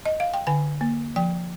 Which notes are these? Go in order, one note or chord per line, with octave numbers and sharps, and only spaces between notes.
D#5
F5
G5
D3 G#5
A#3
F3 G5